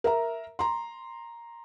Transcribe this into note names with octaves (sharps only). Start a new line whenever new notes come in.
A#4 E5 A#5
A#5 C6